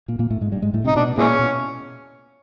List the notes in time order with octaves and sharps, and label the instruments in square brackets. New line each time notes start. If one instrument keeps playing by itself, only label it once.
[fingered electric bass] A#2 A#3
A#2 A#3
A2 A3
G#2 G#3
G2 G3
G#2 G#3
A2 A3
C3 C4
[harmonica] D#4
[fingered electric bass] B2 B3 [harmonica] D4
[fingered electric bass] A#2 A#3 [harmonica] E3 G#3 C#4
[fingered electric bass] B2 B3